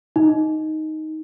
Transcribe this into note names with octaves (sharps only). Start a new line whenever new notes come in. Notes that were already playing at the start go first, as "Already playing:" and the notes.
D#4